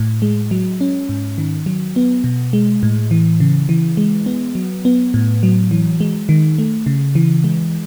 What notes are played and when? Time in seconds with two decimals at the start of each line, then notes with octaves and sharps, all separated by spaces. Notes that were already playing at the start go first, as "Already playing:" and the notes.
Already playing: A2
0.22 G#3
0.51 F#3
0.81 C#4
1.09 G#2
1.38 D#3
1.66 F#3
1.96 B3
2.24 B2
2.53 G#3
2.83 A2
3.11 E3
3.40 C#3
3.69 E3
3.97 G#3
4.26 B3
4.55 F#3
4.85 B3
5.14 A2
5.43 F#3
5.71 E3
6.01 G#3
6.29 D#3
6.58 A3
6.86 C#3
7.15 E3
7.44 G#3